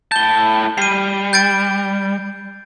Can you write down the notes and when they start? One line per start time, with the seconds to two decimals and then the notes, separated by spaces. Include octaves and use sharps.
0.12 A2 A5 G6 G7
0.78 G3 C7 D#7
1.33 G6 A6 D7